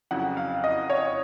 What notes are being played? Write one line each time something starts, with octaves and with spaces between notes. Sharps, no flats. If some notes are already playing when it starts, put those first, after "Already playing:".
F2 C#3 F#3 F#5
F5
D#5
C#5